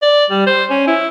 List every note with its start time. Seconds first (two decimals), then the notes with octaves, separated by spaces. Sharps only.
0.02 D5
0.30 G3
0.47 C5
0.70 C#4
0.87 E4